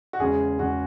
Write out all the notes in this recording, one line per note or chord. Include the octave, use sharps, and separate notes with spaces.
F#4
E2 C#3 G#3 G#4
E2 C#3 G#3 F#4